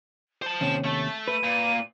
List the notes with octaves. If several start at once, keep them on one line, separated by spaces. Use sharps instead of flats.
C5 A5
D#2 C3 C#4 E7
A3 A5
B4 D#7
A#2